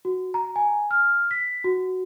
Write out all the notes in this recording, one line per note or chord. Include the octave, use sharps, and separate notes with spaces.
F#4
A#5
G#5
F6
B6
F#4